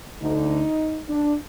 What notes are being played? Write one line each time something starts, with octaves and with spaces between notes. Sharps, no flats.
D2 D3 D#4
D4